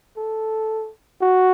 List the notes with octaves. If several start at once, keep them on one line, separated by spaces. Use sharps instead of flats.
A4
F#4